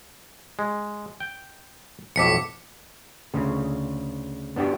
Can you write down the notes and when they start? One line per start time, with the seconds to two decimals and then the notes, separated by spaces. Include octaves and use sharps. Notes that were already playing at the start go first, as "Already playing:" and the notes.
0.59 G#3
1.20 G5
2.16 B1 F2 A2 D6 B6 C#7
3.34 D2 C#3
4.56 B3 D4 F#4 G4